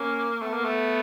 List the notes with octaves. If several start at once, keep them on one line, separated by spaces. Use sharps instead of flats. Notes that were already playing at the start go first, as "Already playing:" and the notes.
Already playing: A#3 C#4
A3 B3
A#3
A3